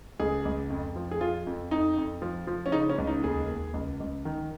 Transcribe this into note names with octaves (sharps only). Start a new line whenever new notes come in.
C#2 G#4
C#2
F2
F3
G#4
F3 F4
F2
F2 D#4
F2
F3
F3
C#4
C#3 D#4
C#4
C#2
D#4
D#2 G#4
D#2
C#2
C#2
D#3